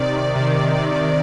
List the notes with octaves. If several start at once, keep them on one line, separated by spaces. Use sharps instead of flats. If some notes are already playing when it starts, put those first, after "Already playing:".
Already playing: C3 D#3 D5
C3 D#3
C3 D#3